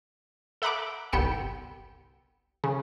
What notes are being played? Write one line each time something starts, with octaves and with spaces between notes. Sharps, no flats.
A4 E5 F#5 A#5 B5 D6
G1 C2 B3 G5 E6 C#7
C#3